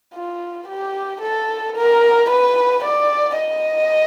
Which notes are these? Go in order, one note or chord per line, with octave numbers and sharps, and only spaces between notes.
F4
G4
A4
A#4
B4
D5
D#5